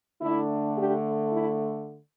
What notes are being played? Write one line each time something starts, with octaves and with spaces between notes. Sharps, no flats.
D3 A3 D4 E4
D4 G4
E4